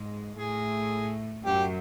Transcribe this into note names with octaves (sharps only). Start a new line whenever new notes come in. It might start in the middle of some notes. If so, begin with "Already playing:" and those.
Already playing: G#2 G#3
A2 A3 G#4
F#2 F#3 G4